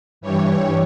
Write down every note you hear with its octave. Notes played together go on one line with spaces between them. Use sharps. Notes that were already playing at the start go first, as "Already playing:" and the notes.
G2 E3 G3 C#5